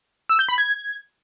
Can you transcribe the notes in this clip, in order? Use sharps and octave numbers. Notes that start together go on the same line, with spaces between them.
E6
G6
B5
G#6